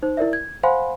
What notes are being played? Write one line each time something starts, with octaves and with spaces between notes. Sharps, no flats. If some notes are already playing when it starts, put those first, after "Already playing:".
D#4 C5
E4 A#4 D5 E5
G#6
C5 F5 F#5 G#5 B5 C6